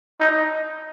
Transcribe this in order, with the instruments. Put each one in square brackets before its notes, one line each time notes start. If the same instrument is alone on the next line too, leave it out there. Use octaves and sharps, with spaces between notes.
[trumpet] D#4